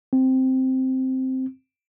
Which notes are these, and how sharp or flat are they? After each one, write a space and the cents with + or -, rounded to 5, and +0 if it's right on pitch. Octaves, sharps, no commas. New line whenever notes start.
C4 -5